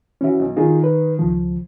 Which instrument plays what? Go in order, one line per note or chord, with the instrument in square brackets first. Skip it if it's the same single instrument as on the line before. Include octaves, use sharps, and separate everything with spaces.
[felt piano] E3 E5 [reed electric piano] C#4 F#4
[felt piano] B1
[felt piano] D#3 D#4 [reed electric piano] F4 G#4
[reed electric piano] B4
C#2 F3